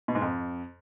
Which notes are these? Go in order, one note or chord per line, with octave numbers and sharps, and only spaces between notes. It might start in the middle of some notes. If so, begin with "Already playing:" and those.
B2
G#2
F2